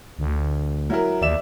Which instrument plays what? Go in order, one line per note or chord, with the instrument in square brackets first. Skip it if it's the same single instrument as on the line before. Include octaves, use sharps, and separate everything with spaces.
[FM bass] D2
[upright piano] F#3 E4 A#4
[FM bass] D#2 [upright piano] D5 E5 E7